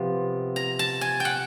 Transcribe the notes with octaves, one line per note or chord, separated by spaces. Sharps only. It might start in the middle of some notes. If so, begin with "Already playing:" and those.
Already playing: C3 F3 B3
A#5
A5
G#5
F#5 G5